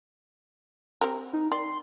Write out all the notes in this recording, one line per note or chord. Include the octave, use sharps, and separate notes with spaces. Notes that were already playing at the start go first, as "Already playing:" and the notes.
C4 G4 A#4
D#4
D#3 D5 C6